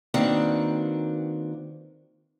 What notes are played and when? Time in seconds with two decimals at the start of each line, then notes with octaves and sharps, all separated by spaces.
0.14 D#3 A#3 C4 D4 F#4 B4